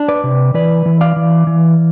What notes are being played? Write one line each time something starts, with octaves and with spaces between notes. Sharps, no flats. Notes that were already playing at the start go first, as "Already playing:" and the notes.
Already playing: D4
B4 D5
C3
E3 B4 D5
E3
D5 F5
E3
E3